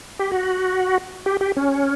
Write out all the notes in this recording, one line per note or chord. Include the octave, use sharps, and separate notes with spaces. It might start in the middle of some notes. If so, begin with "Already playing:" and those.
G4
F#4
G4
G4
C#4